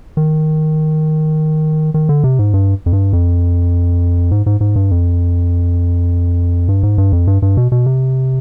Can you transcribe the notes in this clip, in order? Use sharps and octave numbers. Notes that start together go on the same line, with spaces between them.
D#3
D#3
D3
C3
G#2
G2
F2
G2
F2
G#2
G#2
G#2
G2
F2
G2
G#2
G2
F2
G2
G2
B2
B2
C3